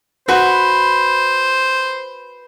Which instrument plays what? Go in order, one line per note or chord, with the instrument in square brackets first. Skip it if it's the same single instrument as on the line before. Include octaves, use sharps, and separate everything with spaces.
[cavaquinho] F#4 [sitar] B4 [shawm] C5